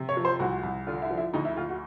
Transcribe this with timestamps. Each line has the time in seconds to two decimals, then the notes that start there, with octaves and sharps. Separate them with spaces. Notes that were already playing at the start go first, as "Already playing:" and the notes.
Already playing: C3
0.09 C#5
0.17 F3
0.25 C5
0.40 C2 F#4
0.63 C2
0.87 D3 F4
1.02 E4
1.11 F3
1.18 E4
1.34 D2 D#4
1.45 E4
1.56 D2 F4
1.69 F#4